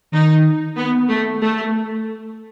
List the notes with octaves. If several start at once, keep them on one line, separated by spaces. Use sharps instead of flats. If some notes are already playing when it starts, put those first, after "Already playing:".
D#3 D#4
B3
A3
A3